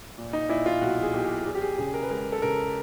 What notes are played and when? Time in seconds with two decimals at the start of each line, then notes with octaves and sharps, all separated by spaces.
0.18 A#2
0.33 D#4
0.49 A#2 E4
0.66 F4
0.81 B1 F#4
1.02 G#4
1.13 B1 G4
1.45 E2 G#4
1.55 G4
1.62 G#4
1.78 C#3 G#4
1.94 A#4
2.02 B4
2.10 G#3 A#4
2.32 A4
2.42 C#3 A#4